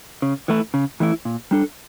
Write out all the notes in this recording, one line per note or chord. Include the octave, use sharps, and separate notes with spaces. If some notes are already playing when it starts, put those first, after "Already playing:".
C#3
E3 A3 E4
C#3
E3 A3 E4
A#2
G3 D4 A4